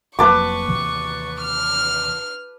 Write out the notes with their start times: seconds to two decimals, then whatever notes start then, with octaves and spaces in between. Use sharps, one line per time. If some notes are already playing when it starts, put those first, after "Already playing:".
0.19 F1 F#3 A#3 B4 A5 C#6 D6
0.68 D#2 C3 E3
1.42 F6